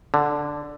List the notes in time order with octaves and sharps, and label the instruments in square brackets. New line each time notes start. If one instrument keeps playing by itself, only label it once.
[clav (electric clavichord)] D3